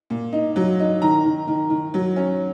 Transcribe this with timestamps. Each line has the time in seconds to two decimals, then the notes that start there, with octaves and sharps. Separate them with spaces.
0.10 A#2
0.33 D#4
0.56 F#3
0.79 D#4
1.02 D#3 A#5
1.25 D#3
1.47 D#3
1.70 D#3
1.94 F#3
2.16 C#4